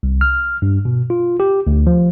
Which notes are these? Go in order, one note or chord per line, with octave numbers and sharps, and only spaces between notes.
C2
F6
G2
B2
F4
G4
D2
F3